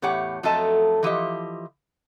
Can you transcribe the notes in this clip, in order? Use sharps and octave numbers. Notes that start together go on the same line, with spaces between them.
E2 A2 G4 C#5 F#5
F2 F#3 A3 A4 D#5 A5
E3 F3 G4 D#5